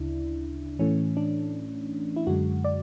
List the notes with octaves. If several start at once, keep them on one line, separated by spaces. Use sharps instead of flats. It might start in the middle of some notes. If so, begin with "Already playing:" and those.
Already playing: D2 C#3 D4 E4
A2 E3 A3 C#4
D4
E4
F#2 D3 G#3 F#4
D5